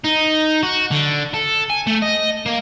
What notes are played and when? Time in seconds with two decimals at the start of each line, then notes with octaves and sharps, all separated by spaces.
0.04 D#4
0.63 F#4
0.91 D3
1.34 A4
1.70 G#5
1.87 A3
2.02 D#5
2.46 A#3